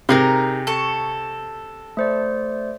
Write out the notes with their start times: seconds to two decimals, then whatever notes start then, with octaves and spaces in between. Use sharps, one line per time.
0.09 C3 D#4 G#4 A#4
0.67 A4 C#6
1.97 A3 C5 D5